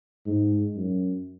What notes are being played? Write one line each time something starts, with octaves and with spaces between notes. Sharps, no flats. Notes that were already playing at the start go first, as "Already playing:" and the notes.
G#2
F#2